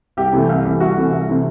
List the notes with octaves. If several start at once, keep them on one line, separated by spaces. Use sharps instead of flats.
C2 G4
C3 E3 A3
C2
C3 E3 A3
C2 F#4
C3 E3 A3
C2
C3 E3 A3